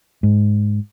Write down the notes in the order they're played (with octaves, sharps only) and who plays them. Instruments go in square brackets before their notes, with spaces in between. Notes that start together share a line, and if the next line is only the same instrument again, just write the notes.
[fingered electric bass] G#2